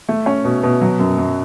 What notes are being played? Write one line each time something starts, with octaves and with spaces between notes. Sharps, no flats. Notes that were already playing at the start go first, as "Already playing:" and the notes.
A3
C#4
B2
B2
F#3
F#2
F#2